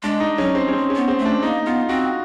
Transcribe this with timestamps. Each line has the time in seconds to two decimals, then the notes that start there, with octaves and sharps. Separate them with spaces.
0.03 G#3 D4
0.20 D#4
0.38 F#3 C#4
0.55 C4
0.68 C#4
0.73 C4
0.90 C#4
0.96 B3
1.08 C4
1.19 A3
1.25 D4
1.43 A#3 D#4
1.66 B3 F4
1.89 C4 F#4